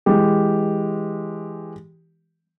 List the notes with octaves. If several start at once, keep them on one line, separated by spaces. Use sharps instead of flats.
E3 G#3 G4